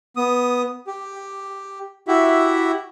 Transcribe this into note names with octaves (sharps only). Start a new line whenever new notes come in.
B3 D#6
G4
E4 F#4 G4 E5